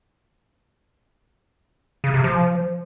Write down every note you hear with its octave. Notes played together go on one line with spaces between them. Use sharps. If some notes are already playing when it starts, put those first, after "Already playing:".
C#3
C3
F3